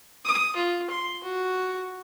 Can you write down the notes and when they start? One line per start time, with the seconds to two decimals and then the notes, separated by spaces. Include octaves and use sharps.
0.24 D#6
0.55 F4
0.90 C6
1.23 F#4